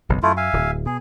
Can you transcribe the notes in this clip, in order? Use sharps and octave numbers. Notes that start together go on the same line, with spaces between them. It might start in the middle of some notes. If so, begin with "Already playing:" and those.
F#1 B1 E2
F#2 A3 E4 F4
E5 F5 G#5
D1
B2 G#4